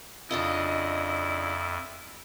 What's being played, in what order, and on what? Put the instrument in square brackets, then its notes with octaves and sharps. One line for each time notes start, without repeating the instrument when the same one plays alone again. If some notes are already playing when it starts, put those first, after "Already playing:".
[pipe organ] F2 [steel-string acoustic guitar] C#3 D4 F4 [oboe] E4 [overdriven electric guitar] D#5